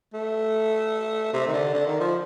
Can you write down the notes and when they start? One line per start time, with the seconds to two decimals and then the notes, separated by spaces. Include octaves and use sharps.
0.14 A3
1.33 C3
1.47 D#3
1.53 D3
1.74 D3
1.86 D#3
2.00 F3